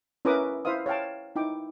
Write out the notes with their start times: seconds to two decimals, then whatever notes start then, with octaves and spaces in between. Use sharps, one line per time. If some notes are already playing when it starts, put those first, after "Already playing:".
0.25 C#4 E4 A#4 B4 D6 D#6
0.65 E4 C5 E5 F5 D#6
0.86 C#5 F5 G5 A5
1.36 D#4 E4 G5 D6